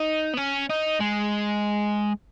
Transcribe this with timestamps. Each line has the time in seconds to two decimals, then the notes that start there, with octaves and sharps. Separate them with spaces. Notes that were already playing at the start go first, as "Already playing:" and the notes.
Already playing: D#4
0.34 B3
0.38 C#4
0.70 D#4
1.00 G#3